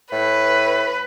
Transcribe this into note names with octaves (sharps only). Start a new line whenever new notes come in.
A2 B4